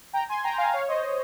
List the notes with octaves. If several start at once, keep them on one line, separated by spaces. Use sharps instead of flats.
G5 A#5
G#5 C6
G5 A#5
F5 G#5
C#5 F5
C5 D#5